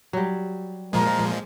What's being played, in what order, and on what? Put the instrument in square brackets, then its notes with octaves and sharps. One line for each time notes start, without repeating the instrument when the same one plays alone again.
[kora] F#3 G3
[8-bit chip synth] A#2 F3 G#3 [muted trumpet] A#4